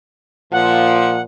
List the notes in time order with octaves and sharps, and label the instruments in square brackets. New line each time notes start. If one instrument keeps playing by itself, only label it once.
[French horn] A#2 [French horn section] F3 [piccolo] F#5